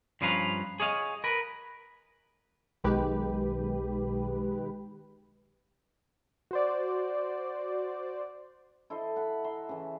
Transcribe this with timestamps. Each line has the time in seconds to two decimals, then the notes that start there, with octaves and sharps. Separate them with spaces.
0.21 G2 F3 C#4 B4 F5 A#5
0.80 G#4 C#5 D#5 F5
1.24 A#4 B4
2.84 B1 D#3 G#3 G4 B4
6.51 F#4 C5 D5
8.90 E4 A4 C5 D#5
9.16 F#5 B5
9.44 E5 A#5 C6
9.69 C#3 E3